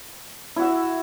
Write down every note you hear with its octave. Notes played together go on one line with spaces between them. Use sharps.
E4 F#4 E5